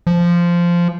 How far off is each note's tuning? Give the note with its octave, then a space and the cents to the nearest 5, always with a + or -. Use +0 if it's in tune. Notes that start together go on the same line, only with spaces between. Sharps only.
F3 -10